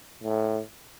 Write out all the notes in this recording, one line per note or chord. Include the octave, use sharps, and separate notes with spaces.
A2